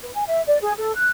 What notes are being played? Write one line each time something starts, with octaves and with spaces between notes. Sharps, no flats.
B4
G#5
E5
D5
G#4
A4
F#6